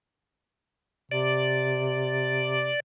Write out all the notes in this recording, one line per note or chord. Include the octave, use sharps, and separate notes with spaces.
C3 D5